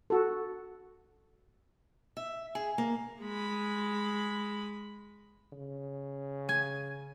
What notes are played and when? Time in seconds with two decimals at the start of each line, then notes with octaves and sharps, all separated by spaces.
0.10 F#4 A4
2.17 E5
2.55 G#4
2.78 A#3
3.21 G#3 B5
5.52 C#3
6.49 G#5